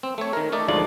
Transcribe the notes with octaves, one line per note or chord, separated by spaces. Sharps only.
C4
A3 C#5
D#3 A#4
A3 D#4 D5
D2 G#2 F3 D5